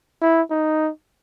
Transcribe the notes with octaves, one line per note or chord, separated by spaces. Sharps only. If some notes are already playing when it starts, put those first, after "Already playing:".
E4
D#4